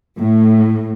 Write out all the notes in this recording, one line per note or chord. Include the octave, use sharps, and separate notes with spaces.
A2